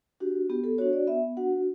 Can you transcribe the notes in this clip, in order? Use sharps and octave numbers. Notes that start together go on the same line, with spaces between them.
D4 F#4 G4
B3 G4
A4
D4 F#4 C#5
D5
B3 E5
D4 F#4 F#5